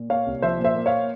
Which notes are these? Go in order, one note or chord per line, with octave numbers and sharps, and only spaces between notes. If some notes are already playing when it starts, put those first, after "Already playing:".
Already playing: A#2
A#3 C#5 F5
C2
F3 C5 E5
A#2
C5 E5
A#3
C#5 F5